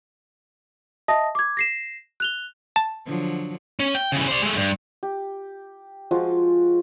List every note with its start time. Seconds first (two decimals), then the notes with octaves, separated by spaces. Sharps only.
1.08 D#5 E5 A5 D#6 A#6
1.35 D6 G#6
1.57 A#6 C7 E7
2.20 F#6 F7 G7
2.76 A5
3.06 D3 F3 F#3
3.80 C#4
3.95 G5
4.12 C#3 E3
4.28 C5 D5
4.42 G#3 A3
4.56 G2
5.03 G4
6.11 F3 G#3 F4 F#4